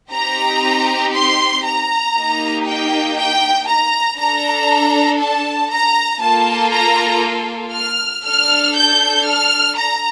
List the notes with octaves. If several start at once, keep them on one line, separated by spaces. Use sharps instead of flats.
C4 D#4 G4 A#5
C6
A#5
A#3 D#4 G4
G5
G5
A#5
D4 A4 A#5
A5
A#5
A#3 F4 A4 A5
A#5
F6
D4 A4 F6
G6
F6
A#5